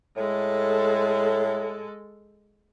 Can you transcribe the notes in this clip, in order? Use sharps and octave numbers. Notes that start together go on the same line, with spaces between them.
A2 G#3 A4